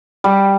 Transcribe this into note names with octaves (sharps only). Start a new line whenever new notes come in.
G3